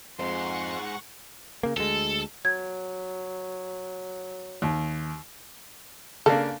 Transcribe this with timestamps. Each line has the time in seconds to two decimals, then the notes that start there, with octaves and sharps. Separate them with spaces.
0.19 F2 G#2 G#3 C5 F#5 C6 C#6
1.63 C#3 A#3
1.77 D2 G#3 A4
2.45 F#3 G#6
4.62 D#2
6.26 C#3 A#3 D4 A4